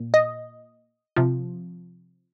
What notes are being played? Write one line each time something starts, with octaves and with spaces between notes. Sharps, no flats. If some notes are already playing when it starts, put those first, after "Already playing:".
Already playing: A#2
D#5
C3 F3